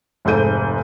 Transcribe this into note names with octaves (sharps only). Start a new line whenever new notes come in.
F1 G#2 A4 G6 D#7